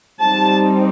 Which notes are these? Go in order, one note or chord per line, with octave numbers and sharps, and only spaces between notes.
G3 C4 D#4 A5